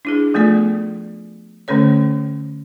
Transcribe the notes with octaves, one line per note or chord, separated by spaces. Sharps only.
D4 E4 G#4
F3 A3 B3 F4 A4 D5
D3 A3 C#4 A4 C#5